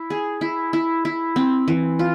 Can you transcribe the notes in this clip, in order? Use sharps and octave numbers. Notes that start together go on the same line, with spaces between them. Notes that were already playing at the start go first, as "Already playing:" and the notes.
Already playing: E4
G#4
E4
E4
E4
C4
E3
F4